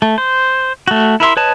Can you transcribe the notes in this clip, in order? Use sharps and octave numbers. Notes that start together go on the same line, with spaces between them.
A3
C5
A3 F#4
E4 A#4 E5 C6
B4 C#5 D#5 A5